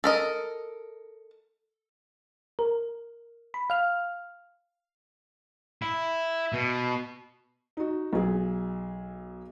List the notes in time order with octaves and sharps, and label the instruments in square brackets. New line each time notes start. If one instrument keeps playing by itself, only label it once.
[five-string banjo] A4 A#4 D#5
[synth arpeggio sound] A#4
B5
F5 F6
[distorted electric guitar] E4
B2
[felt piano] D#4 F#4
B1 G#4